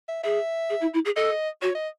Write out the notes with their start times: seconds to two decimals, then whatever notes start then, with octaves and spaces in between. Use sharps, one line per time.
0.08 E5
0.24 G#4 E5
0.70 G#4
0.81 E4
0.93 E4
1.05 G#4
1.16 A4 D#5
1.62 F#4 C#5
1.75 D#5